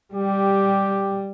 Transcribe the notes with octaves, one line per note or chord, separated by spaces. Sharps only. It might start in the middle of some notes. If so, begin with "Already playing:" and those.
G3 G4